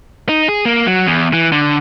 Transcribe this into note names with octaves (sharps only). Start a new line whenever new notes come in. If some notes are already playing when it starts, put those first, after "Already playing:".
D#4
G#4
A#3
F#3
E2
E3
D3